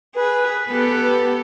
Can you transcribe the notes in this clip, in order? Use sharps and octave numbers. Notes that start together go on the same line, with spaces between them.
G#4 B4
B3 G4 A4